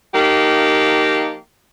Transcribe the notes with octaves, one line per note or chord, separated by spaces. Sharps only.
F3 A#3 D#4 G4